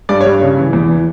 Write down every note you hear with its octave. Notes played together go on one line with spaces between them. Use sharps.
G2 D5
C#5
G2
C#3
E3
E2
E3